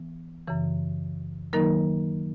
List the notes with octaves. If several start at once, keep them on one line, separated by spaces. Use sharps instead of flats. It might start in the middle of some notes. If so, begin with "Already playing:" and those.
Already playing: E3 B3
F#2 C#3 E3
D#3 F#3 A#3 D#4 A#4